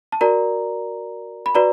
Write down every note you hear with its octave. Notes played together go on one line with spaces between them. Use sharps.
A5
F#4 A#4 D5 A#5
B5
F#4 B4 D5 A#5